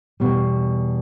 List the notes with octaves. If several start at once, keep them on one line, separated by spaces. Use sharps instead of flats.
E2 B2 G3